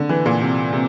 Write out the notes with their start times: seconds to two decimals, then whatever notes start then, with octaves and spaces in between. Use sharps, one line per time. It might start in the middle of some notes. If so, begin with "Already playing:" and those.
Already playing: D3
0.09 E3
0.26 A#2
0.41 C3
0.73 C3